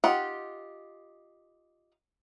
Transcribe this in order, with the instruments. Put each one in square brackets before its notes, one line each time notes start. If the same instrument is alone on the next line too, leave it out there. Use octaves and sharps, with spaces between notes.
[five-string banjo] D#4 F4 G4 F#5